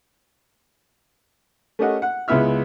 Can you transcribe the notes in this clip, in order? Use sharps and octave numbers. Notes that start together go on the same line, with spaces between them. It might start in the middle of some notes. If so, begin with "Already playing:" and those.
A3 C#4 G4 A#4 D#5 F#5
F#5
C#2 G#3 B3 E4 E5 F6